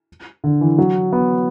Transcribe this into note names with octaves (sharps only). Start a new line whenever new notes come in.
D3
E3
F#3
B3